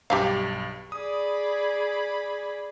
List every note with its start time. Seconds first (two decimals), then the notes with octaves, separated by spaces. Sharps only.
0.10 B1 G2 G4 E5 F5
0.92 G#4 D5 B5 D#6